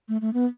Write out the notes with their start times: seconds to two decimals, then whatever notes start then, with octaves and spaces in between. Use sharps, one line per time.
0.08 A3
0.21 A3
0.34 B3